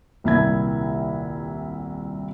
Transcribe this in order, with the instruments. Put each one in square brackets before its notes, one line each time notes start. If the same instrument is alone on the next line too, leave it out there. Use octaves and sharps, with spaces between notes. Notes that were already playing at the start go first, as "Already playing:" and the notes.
[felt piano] D#1 C2 E4 E5 B5 G#6